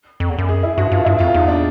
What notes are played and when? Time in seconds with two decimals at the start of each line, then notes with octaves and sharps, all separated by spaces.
0.20 F2
0.30 E2
0.38 F#2
0.49 G#4
0.63 E4
0.78 G2 F#4
0.91 G2 F4
1.05 G2 E4
1.19 F2 F4
1.34 E2 D#4
1.48 D4